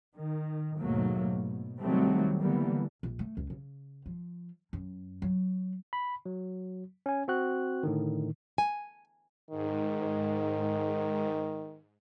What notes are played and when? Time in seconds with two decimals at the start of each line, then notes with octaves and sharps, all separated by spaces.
0.15 D#3
0.80 D#2 G#2 B2 F#3 A3 A#3
1.21 B2
1.79 C2 D#3 F#3 G3 A3 C4
2.39 D3 E3 G3 A#3 B3
3.03 A#1
3.19 A3
3.37 C#2
3.50 C#3
4.06 F3
4.73 F#2
5.22 F#3
5.93 B5
6.26 F#3
7.06 C#4 G#5
7.28 C4 F#4 F#6
7.83 A2 D3 D#3
8.58 G#5
9.51 G#2 D#3